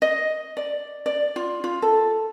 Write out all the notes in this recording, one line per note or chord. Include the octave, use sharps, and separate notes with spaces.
D#5
D5
D5
F4
F4
A4